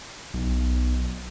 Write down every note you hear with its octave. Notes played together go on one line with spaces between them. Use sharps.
B1